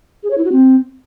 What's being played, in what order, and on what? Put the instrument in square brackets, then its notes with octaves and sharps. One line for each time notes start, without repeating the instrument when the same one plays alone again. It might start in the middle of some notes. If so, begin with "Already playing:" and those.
[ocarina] G#4
C#5
E4
F#4
C4